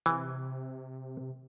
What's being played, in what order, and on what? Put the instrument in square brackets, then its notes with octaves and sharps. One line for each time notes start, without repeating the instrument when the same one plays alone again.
[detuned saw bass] C3 [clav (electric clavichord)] E3